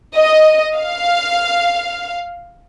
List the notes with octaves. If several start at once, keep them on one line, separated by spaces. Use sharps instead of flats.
D#5
F5